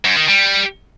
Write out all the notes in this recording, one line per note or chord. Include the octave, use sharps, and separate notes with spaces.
F#2
D#3
G3